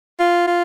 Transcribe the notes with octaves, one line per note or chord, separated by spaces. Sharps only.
F4
F4